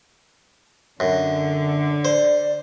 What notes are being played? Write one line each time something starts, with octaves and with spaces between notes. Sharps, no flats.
F#2 D3
C5 D5